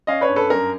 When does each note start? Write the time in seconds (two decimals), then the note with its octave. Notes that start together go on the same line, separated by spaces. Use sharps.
0.07 C#4 D#5 F5
0.21 B4 C#5
0.28 G2
0.36 A4 B4
0.50 F#2 A#4